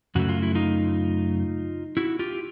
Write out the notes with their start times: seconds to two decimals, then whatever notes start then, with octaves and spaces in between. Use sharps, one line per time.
0.15 F#2 C#3 F#3 A3 F#4
0.29 F4
0.42 E4
0.55 D#4 F4
1.97 E4 F#4
2.19 F4 G4